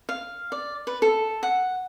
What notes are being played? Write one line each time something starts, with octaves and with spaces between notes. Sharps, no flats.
F5
D5
B4
A4
F#5